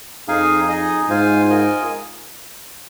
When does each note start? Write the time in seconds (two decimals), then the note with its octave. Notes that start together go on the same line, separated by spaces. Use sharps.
0.28 F2 D#4 G#4 F5 G#5
0.68 D#4 G#4 D#5 G#5
1.09 G#2 F4 C5 F5 G#5
1.49 F4 A#4 D#5 G#5